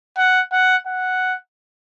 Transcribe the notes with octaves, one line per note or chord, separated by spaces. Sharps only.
F#5
F#5
F#5